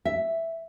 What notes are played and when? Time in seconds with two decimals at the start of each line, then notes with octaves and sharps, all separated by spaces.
0.05 E5